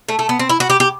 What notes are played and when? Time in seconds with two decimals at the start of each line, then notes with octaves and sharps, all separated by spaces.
0.09 A3
0.19 A3
0.29 B3
0.39 C4
0.49 E4
0.60 F#4
0.70 G4
0.80 G4